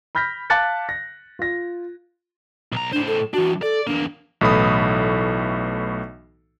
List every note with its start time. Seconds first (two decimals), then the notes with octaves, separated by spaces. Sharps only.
0.15 B5 F6 G6 A#6 B6
0.50 F5 A5 D6 F#6 A6 C#7
0.89 A#6
1.39 F4 A#6
2.72 B1 A#5
2.93 A2 D4 C5
3.07 A4
3.34 E3 D4 F#4
3.62 A4 D5
3.87 E2 A#3 D4
4.41 B1 A2 E3 A4 B5 D#6